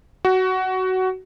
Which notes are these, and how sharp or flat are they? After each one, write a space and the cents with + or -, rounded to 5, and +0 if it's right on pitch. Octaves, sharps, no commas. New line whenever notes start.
F#4 +15